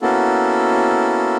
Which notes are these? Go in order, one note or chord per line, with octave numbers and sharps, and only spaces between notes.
A#3 B3 C#4 E4 F#4 A4